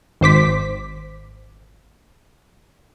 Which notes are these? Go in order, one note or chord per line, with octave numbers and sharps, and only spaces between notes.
G#1 C5 D6 B6